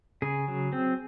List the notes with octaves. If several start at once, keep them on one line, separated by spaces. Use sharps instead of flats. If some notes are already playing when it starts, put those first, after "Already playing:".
C#3 G#4
F#3
C4